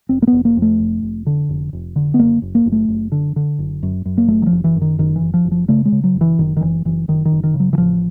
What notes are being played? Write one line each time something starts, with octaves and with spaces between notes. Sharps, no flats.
F1 C4
A#3
F1 B3
A#3
F2
A3
F1
F1
D3
F1
F1
D3
B3
F#1 A#3
F#1
A#3
F#1
A3
F#1
D3
D3
F#1
F#2
F#2
A#3
F#1 A3
F#3
F3
F#1
E3
F#2
D#3
F#1 D#3
E3
F#1
F3
F#1
F3
C#3 A3
G#3
C#3
F#3
F#1
E3
F#1 D#3
D#3
F#1 E3
F#1 E3
F#1 D#3
D#3
F#1
D#3
C#3
F#3
E3
A1 F3